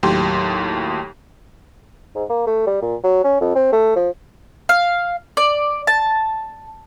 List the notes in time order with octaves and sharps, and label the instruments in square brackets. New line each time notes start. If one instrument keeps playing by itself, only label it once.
[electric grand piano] D#2 A2 F#3 G4 C6
[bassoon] G#2
A#3
A3
G3
A#2
F#3
C#4
F2
C4
A3
F3
[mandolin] F5
D5
A5